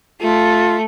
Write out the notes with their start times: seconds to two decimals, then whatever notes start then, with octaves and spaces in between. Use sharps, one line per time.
0.21 A3 F4